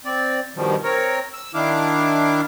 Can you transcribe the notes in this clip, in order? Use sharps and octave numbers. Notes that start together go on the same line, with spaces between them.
C4 D5
G2 B2 D#3 F3 G3
C4 A#4 C#5
E6
D#3 D4 E4 F5 D6